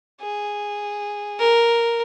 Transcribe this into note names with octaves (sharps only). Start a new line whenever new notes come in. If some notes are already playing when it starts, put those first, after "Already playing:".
G#4
A#4